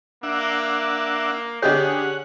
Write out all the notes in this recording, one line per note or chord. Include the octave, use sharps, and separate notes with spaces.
A#3 D4 E5 F#5
D3 C#4 G4 G#4 C#5 D#5 F#5